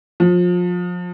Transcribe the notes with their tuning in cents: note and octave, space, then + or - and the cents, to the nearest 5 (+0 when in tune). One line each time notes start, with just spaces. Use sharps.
F3 +30